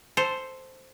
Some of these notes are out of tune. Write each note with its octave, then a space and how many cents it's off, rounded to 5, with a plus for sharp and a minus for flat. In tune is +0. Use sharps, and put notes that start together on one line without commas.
A4 +0 C5 +0